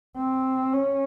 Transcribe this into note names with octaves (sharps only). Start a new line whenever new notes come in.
C4
C#4